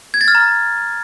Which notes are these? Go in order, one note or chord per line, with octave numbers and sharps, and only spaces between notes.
G#6
A6
F6
A#5